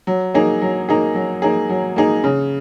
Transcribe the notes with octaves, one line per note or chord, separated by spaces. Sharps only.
F#3
A#3 D#4 G#4
F#3
A#3 D#4 G#4
F#3
A#3 D#4 G#4
F#3
A#3 D#4 G#4
C#3